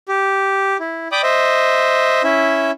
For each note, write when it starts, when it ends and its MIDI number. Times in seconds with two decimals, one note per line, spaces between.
0.08 0.77 67
0.80 1.08 64
1.12 1.21 74
1.12 1.21 79
1.12 1.21 83
1.12 1.21 86
1.12 1.21 87
1.23 2.22 72
1.23 2.22 75
1.23 2.22 76
2.24 2.71 61
2.24 2.71 64
2.24 2.71 76